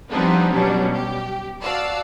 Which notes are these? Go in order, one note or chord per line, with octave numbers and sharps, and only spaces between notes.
F3 G3 B3 C4 D4 D#4
B2 F#3 G3 C#4 D4
G4
F#4 D5 F5 A5 E6